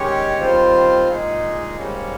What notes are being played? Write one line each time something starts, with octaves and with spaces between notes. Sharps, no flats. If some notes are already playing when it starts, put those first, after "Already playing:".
Already playing: D#3 G#3 C#4 G4 C#5
D#3 G3 C4 F4 C5
A#2 G#3 D#4 G#4
G#2 G3 A#3 C#4